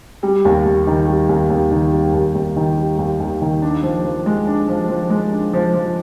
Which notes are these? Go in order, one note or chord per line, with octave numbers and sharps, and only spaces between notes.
G3
D#2
D#2
D#3
G3
D#2
D#2
D#3
G3
D#2
D#2
D#3
G3
D#2
D#2
D#3
D4
F3
F3
G#3
D4
F3
F3
G#3
D4
F3
F3